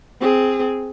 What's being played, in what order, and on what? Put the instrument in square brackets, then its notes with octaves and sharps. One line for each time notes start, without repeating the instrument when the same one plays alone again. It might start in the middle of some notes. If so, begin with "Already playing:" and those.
[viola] C4 G#4